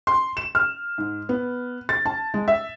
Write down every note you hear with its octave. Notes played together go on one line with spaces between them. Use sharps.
C6
E7
F6
G#2
B3
A6
A5
G#3
E5